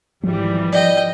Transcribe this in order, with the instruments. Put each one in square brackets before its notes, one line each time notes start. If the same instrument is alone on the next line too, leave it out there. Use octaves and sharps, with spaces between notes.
[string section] G#1 E3 G3 [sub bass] F3
[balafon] D5 [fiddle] D#5 G5